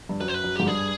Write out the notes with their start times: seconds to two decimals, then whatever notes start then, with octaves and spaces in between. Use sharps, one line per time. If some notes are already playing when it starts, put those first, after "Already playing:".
0.09 G2
0.21 F#2 B4
0.28 C5
0.34 B4
0.44 F#2
0.56 G#2 G4
0.66 G2 G#4